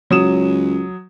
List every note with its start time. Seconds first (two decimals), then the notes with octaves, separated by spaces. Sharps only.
0.10 C#2 F#3 D#6 E7